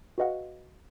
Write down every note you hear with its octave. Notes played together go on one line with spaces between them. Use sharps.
F#4 G#4 B4 D#5 F5 F#5